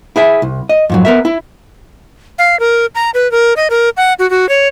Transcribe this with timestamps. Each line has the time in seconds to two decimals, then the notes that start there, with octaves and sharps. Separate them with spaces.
0.16 E4 G#4 E5
0.42 C2
0.69 D#5
0.90 F2 G#2 F#3
1.05 B3 A#4 E5
1.25 E4
2.39 F5
2.60 A#4
2.95 A#5
3.14 B4
3.32 A#4
3.57 D#5
3.70 A#4
3.97 F#5
4.19 F#4
4.31 F#4
4.49 C#5